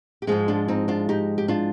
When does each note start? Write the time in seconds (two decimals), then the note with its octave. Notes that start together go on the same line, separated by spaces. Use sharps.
0.22 G4
0.27 G#2 F3 G#3 F4 G#4
0.48 D4 F4
0.68 C4 D#4
0.88 D4 F4
1.09 D#4 G4
1.38 G4
1.48 D4 F4